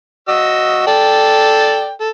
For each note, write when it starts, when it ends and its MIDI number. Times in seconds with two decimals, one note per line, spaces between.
0.28 0.85 66
0.28 0.85 75
0.28 0.85 88
0.87 1.91 69
0.87 1.91 74
0.87 1.91 79
2.00 2.09 69